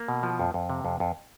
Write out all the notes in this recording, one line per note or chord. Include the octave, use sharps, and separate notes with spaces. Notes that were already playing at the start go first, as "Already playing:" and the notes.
Already playing: A#3
B2
F3
F2
F2
C3
F2
F2